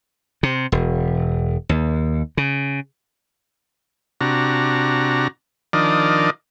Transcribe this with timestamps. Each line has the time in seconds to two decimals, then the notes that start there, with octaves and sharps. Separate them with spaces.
0.43 C3
0.72 E1
1.69 D#2
2.37 C#3
4.21 C3 D4 F#4 A#5
5.73 D#3 F3 D4 A#4 D5 D#5